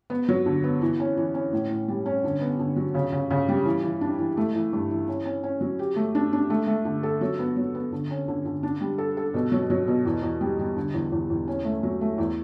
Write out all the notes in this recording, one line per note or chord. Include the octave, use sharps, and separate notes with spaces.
B3
F#3
D3
B3
E3
C#4
E3
C#4
A2
A2
G3
C#4
D3
B3
D3
F#3
C#3
C#3
C#3
G3
E3
E3
D4
E3
A3
E3
G2
E3
C#4
C#4
C#4
F#3
G4
A3
D4
D4
A3
A3
D3
A4
F#3
B3
F#3
B3
D3
C#4
D3
D3
D4
G3
A4
A4
B2
F#3
F#3
B2
E2
E2
G3
G3
D3
E2
E2
E2
C#4
A3
F#3
A3
E2